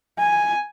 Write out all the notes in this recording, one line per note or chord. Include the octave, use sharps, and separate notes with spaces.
G#5